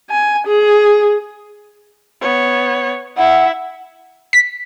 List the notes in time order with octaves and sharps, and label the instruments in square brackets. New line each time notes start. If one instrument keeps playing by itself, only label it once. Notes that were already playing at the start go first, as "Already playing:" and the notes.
[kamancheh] G#5
G#4
B3 C#5
[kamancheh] E4 E5 [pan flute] F#5
[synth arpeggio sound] B6